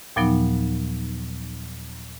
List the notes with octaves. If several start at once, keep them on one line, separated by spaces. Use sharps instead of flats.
D#2 A#2 F3 F#3 B3 D#4